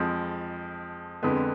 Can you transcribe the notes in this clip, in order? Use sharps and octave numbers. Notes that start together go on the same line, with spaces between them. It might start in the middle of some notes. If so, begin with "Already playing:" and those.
Already playing: F2 F3 G#3
F2 D3 G#3 B3 B4